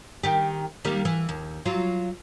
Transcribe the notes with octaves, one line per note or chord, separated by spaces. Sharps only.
D#3 G4
D#3 G3 A#3
E3
D#2
F#3 F4